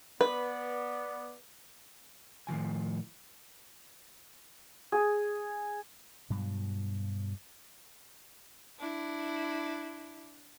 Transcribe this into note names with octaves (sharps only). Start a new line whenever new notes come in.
B3 B4 D5
A2 D#3 F3 G#5
G#4
G2 B2 F#3
D4 E4